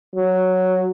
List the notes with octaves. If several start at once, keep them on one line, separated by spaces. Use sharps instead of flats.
F#3